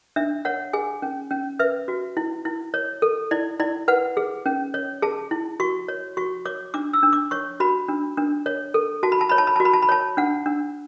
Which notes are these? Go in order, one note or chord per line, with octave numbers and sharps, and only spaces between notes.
D4 E5
C#5 F#5
G#4 G#5
C#4
C#4
B4 E5
F#4
E4
E4
C#5
A4
E4 D5
E4 D5
B4 F#5
G#4
C#4
C#5
G#4 A5
E4
F#4 C#6
C#5
F#4 C#6
C#5 D6
D4 D6
E6
D4
D6
C#5 C#6
F#4 B5
D4
D4
C#5
A4
F#4 A5
B5
A5
C#5 B5
A5
B5
A5
F#4
B5
A5
B5
C#5 A5
D4 F#5
D4